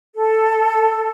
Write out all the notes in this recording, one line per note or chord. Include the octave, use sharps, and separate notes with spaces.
A4